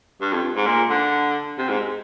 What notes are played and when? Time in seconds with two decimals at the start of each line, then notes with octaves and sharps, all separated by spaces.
0.21 G2
0.32 F2
0.56 G#2
0.66 A#2
0.90 D3
1.58 C3
1.69 G#2